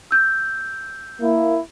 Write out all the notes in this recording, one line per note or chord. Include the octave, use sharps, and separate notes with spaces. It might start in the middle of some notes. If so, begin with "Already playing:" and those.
E6 G6
A#3 E4